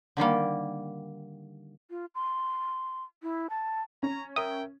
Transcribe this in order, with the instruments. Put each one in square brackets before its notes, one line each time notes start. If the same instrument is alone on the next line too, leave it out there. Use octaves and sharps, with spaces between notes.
[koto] D3 D#3 G3 A#3
[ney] F4
C6
E4
A5
[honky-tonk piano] C#4 [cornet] A#5
[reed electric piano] A#4 E5 [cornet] G5 [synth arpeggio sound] D#6